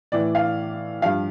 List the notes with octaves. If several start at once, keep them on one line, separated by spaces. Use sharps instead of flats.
A2 E3 D5
F5
G2 F3 F5